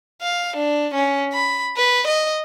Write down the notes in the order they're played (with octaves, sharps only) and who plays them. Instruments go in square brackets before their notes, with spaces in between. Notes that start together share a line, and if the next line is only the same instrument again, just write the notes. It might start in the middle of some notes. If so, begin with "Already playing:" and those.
[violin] F5
D4
C#4
B5
B4
D#5